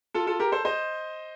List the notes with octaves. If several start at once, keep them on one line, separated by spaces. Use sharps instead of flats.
F4 A4
F4 A4
G4 A#4
A4 C5
C5 D#5